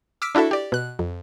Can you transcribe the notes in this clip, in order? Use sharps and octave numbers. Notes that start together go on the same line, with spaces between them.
D6 E6 F6 B6 D7
D4 E4 F#4 A4 E5
G4 D5
B2 F#6
F2